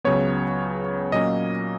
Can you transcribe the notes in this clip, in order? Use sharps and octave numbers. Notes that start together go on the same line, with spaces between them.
C#2 C#3 F#3 B3 C#5
A#2 F#3 A#3 C#4 D#5